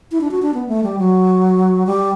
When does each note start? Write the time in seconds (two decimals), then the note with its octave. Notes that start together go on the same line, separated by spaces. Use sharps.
0.11 E4
0.21 D4
0.31 F#4
0.42 D4
0.54 B3
0.68 A3
0.83 G3
0.98 F#3
1.87 G3